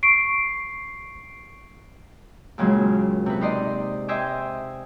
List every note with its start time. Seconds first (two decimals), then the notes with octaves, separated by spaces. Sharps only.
0.03 C#6 C7 D7
2.58 D#2 A#2 C#3 F#3 G#3
3.26 C3 B4
3.41 D#4 C5 D5 D#5
4.08 C5 D#5 E5 G5 G#5 D6